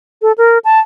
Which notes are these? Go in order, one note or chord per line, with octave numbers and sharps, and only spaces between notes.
A4
A#4
A5